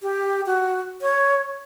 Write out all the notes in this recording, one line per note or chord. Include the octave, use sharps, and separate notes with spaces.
G4
F#4
C#5